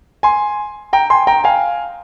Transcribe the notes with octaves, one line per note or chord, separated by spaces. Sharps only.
G#5 C6
G5 A#5
G#5 C6
G5 A#5
F5 G#5